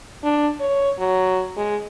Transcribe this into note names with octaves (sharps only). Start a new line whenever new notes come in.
D4
C#5
F#3
G#3